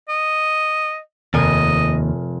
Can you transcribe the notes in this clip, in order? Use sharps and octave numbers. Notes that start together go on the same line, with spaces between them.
D#5
F1 D#2 A#4 D#5 G#5